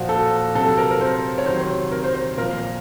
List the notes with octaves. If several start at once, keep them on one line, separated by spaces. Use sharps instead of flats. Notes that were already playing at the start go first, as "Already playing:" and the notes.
Already playing: A#2 F3 F#4
A4
C3 F#3 A4
A#4
A#4
C5
C#5
C3 D#3 F#3 C5
A#4
C5
C5
A#2 F3 A#4